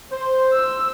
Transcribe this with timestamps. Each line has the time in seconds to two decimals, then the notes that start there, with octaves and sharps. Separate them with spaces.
0.12 C5
0.53 E6